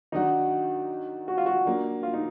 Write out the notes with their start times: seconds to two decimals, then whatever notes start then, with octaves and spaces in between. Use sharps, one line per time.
0.12 D#3 F#3 D4 D#4 F#4
1.28 F#4
1.37 F4
1.46 F#4
1.65 F#3 A#3 D4
2.03 F4
2.13 D#4